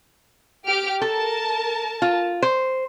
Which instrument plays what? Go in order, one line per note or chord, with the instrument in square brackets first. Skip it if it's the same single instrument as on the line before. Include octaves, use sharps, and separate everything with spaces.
[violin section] G4 F6 D7
[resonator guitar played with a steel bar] A4 [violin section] A#4 A5
[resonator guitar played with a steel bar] F4
C5